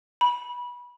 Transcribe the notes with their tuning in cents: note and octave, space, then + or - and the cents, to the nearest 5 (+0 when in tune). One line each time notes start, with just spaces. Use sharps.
B5 -20